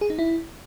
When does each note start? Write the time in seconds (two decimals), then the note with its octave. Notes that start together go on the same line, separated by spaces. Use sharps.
0.01 G#4
0.10 D#4
0.19 E4